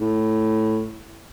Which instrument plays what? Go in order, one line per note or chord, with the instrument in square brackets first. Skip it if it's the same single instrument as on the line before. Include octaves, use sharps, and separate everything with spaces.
[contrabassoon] A2